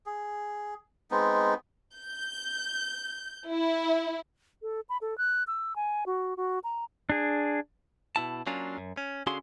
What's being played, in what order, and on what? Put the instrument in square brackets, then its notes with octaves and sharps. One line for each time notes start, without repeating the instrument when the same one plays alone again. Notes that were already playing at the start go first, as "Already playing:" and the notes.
[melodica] G#4
G#3 B3 C4 D#4
[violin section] G6
E4
[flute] A4
B5
A4
F#6
E6
G#5
F#4
F#4
A#5
[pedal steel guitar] D4 G#4
[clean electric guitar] B2 E4 A5
F#3 A#3 C#4 D4 F4
F#2
C#4
D3 C#4 F#4 G#4 F5 C6